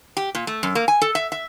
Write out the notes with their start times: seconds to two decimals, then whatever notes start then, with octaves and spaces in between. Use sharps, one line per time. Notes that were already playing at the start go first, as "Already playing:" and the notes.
0.17 G4
0.35 A#2
0.47 A3
0.63 F#2
0.75 A#3
0.88 G#5
1.02 A4
1.15 E5
1.32 E5